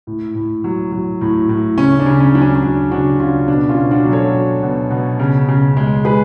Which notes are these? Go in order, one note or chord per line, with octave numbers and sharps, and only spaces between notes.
A2
A2
F#3
F#3
A2
A2
C#3 C#4
D4
C#3
C#4
F#3 D4
C#4
C#4
F#3 D4
C#3 D4 F#4
C#3 C#4 F4
B2 D4
C#4 F4
B2
D4 F#4
F#3
A4 C#5
F#3
B2
B2
C#3
C#3
G#3
G#3 G#4 B4